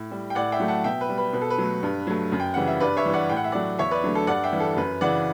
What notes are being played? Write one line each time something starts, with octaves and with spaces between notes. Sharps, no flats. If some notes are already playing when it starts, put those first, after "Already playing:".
Already playing: A2
G3
G5
A2 D5 F#5
E5 G5
F#3 A3
F#5 A5
B2 E5 G5
B4
G3
B4
B2 B4
A4
B4
F#3 A3
G2
F#3 A3
F#2
G5
C#3 E3 G3 F#5
E5
G2 B4 D5
C#5 E5
E3 G3
D5 F#5
A2 G5
F#5
E5
F#3 A3 D5 F#5
E2 C#5 E5
B4 D5
D3 F#3 A3
A4
G2 D5 F#5
E5 G5
E3 G3
A4
F#2 B4
C#3 E3 D5 F#5